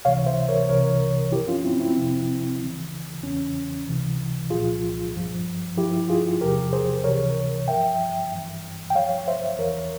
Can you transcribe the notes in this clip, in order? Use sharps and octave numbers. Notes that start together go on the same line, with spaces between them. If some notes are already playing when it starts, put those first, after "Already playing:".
C#2 C3 E3 C#5 F5
C5 E5
A#4 C#5
C2 C3 E3 A#4 C#5
G2 F3 E4 G4
C#4 F4
C4 E4
C4 E4
F2 C3 F3
C#2 C#3 E3
E2 C#3 E3 C#4
C#2 C3 E3
C2 A#2 F3 F4 G#4
G2 F3
G2 F3 E4 G4
F4 G#4
E2 C3 F3 G4 A#4
G#4 C5
C#2 C3 E3 A#4 C#5
G2 F3 E5 G5
G2 E3
G5
G2 F3 C#5 F5
C5 E5
E2 E3 A#4 C#5